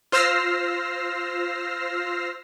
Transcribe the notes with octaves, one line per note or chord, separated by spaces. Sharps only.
F4 C5 E6 F6 A#6 C7